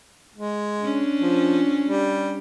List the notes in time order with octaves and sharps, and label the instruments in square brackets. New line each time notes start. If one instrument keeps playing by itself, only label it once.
[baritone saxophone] G#3
[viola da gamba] C#4 D4
[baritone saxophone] F3
G3